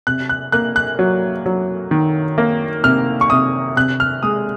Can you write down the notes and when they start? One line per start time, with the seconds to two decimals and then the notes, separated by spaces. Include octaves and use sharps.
0.07 C3 F#6
0.29 F#6
0.52 A#3 F#6
0.76 F#6
0.99 F#3
1.46 F#3
1.91 D#3
2.38 A#3
2.84 C3 F6
3.21 C#6
3.30 C3 D#6
3.76 C3 F#6
4.00 F6
4.23 G#3 D#6